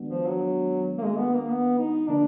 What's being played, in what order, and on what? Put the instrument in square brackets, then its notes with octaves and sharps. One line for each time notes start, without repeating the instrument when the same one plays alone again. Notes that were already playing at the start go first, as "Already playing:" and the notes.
Already playing: [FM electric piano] D#3 G#3 B3 D4 F#4
[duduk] F3
F#3
A#3
G#3
B3
A#3
B3
D#4
[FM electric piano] D3 F3 A#3 [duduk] D4